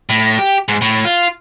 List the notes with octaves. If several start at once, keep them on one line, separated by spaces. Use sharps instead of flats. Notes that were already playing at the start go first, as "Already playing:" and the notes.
A2
G4
G#2
A2
F4